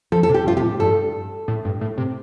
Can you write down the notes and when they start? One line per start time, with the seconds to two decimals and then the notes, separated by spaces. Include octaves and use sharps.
0.12 F3 A4
0.23 A4
0.29 C3
0.34 G4
0.46 G2 F4
0.57 C3 G4
0.62 A2
0.79 G2 A4
1.48 A2
1.65 G2
1.81 A2
1.98 C3